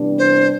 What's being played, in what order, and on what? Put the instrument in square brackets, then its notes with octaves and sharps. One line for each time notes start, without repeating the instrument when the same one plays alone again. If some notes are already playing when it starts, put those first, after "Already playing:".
Already playing: [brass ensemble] C3 E3 G3 B3 D4
[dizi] C5